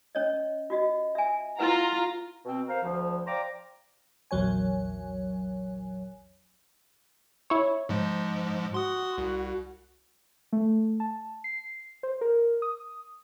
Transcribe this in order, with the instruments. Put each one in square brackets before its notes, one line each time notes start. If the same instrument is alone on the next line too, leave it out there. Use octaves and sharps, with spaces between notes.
[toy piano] C#4 C#5 D#5
F4 F#4 D#5
E5 G#5
[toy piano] E4 B4 F#5 [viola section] F4 A#5
[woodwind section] B2 C4
A#4 C5 F5
D2 F3
C5 D5 F5 G5 A#5 D6
[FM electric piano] A#1 E2 F#3 C#5 G#5
[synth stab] E4 C#5
[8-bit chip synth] G#2 F3 G#3
[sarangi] F#4 [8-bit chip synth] C6 D#6
[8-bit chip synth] C2
[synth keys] A3
A5
C7
C5
A#4
D#6